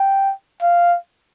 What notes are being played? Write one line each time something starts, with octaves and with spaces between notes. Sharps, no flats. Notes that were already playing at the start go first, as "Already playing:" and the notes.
Already playing: G5
F5